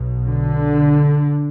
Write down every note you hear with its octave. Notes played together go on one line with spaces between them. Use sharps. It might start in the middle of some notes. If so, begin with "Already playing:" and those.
Already playing: B1 B2
D3